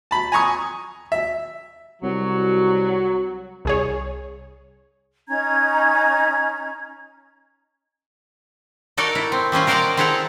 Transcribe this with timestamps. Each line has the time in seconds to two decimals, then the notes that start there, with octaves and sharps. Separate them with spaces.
0.11 A5 B5
0.32 G#5 A#5 C#6 D#6
1.12 E5
2.03 C2 F#3 F#4
3.65 C2 G#4 C#5
5.28 C#4 D#4 A#5 G#6
8.97 D#4 F#4 A4 A#4 D5 D#5
9.15 E4
9.32 C4
9.52 G3 C4 C#4 F4
9.67 A#4 C5 D5 D#5 F#5 A#5
9.97 C4 E4 G#4 A4 F#5 A#5